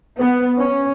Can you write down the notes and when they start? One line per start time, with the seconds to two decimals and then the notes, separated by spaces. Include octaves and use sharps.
0.19 B3
0.57 C#4